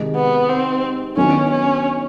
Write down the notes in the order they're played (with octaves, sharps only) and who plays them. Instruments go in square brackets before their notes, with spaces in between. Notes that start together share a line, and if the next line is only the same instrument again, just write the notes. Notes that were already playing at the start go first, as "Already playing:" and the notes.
Already playing: [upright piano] C3 D#3 G#3
[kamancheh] B3
C4
[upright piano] D#3 F#3 B3 D4 F#4 [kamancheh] C#4
[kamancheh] C#4